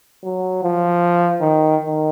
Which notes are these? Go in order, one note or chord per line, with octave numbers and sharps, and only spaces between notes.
F#3
F3
D#3
D#3